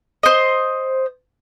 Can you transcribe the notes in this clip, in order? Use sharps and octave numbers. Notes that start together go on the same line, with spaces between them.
C5 D#5